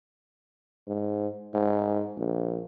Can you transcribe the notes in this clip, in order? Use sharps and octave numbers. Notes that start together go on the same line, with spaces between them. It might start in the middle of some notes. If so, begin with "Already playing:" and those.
G#2
G#2
A#1